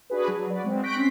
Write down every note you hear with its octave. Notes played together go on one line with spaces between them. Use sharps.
D4 F#4 G#4 B4
F#3
F#4 B4 D5
G#3 C4
C#6 F#6 G6 A#6 B6 D7
C4 C#4 C6 B6